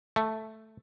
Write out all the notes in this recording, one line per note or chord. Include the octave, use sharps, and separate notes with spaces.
A3